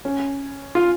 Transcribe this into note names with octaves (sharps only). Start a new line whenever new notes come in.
C#4
F4